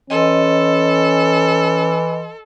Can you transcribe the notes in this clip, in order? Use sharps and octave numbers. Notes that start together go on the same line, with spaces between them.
E3 C#4 A4 D#5 C6